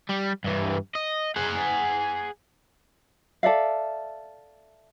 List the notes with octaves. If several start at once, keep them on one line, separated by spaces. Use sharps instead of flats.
G3
G2 E3
D#5
G#4 F#5
A4 D5 E5 F5